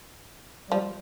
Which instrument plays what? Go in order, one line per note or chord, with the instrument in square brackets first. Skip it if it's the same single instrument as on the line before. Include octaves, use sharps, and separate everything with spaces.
[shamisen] F3 [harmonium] G3